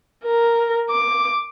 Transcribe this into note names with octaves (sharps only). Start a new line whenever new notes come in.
A#4
D6